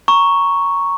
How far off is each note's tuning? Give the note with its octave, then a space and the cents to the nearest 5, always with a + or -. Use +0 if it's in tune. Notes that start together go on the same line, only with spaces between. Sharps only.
A#5 +0 C#6 +0